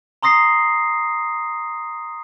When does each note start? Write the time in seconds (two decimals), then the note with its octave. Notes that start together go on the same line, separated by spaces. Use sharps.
0.23 A#5 C6 D#6 A#6 C7